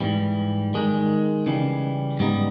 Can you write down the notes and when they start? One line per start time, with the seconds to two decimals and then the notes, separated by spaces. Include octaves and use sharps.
0.01 G#2 E3 G3
0.74 D#3 G#3 D#4
1.46 C#3 E3 G3
2.19 G#2 G3 B3 D#4